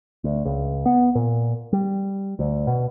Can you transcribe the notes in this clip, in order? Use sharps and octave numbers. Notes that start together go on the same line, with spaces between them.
D2
C#2
B3
A#2
G3
D2
B2